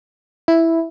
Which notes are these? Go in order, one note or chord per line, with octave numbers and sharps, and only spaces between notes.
E4